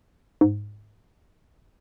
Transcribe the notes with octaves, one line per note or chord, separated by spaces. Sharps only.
G#2